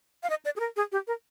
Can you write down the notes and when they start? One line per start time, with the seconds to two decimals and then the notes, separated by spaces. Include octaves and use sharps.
0.23 F5
0.30 D#5
0.45 D5
0.56 G#4
0.60 A#4
0.76 G#4
0.92 G4
1.07 A#4